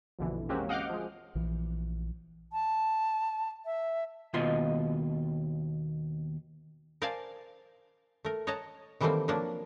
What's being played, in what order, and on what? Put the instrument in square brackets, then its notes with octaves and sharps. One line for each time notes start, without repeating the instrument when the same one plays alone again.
[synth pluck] A#1 F2 B2 D3 E3
G#3 A#3 C4 C#4 F#4 G4
D#5 F5 F#5 D6 F6 G6
F3 G#3
[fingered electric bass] A#1 E3
[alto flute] A5
E5
[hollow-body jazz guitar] D#2 B2 F4 D#5 C6
[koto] A#4 C5 D5 F5 G#5 A5
A3 A#4
C#5 D#5 F#5 A5 A#5
D#3 E3 G3 A3 A#3 C4
F3 F#3 A#3 D4